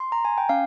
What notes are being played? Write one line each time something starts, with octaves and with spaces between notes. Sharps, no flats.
C6
A#5
G#5
G5
C#4 F5